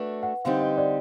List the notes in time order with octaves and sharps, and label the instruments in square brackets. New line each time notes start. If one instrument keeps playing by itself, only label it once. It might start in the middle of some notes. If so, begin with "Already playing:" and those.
Already playing: [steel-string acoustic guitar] A3 D4 F#4 [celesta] B4
[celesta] F#5
[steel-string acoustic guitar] D3 G3 C4 D#4 G4 [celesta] F5
[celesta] D#5
D5